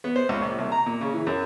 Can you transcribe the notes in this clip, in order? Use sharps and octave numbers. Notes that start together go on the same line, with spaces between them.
B3
C5
C#2
A#1
C2
A#5
A#2
C#3
E3
F#2